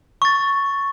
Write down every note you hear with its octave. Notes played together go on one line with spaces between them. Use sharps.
C#6 A6